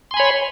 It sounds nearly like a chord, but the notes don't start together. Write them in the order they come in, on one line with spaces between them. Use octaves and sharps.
C6 G#5 B5 C#5